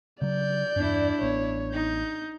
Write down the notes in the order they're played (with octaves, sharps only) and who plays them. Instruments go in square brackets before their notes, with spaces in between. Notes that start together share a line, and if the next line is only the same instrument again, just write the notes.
[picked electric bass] C#3 F#3 [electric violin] D5 G6
[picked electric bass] E2 G2 [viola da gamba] D4 E4
[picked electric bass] A1 B3 [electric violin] C#5
[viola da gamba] D#4 [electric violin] G6